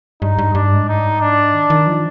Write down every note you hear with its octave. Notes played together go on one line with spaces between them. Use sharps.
G2 D#4
G2
G2 D4
G#2
D#4
D4
D#3
D#3
F3